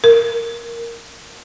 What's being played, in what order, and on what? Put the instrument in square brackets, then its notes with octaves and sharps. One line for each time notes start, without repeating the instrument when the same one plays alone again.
[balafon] A#4